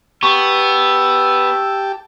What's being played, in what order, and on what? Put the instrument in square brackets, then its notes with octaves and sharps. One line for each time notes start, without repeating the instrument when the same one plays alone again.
[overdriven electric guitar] B3 [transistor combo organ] G4 A5 [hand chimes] C#6 [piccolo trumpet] E6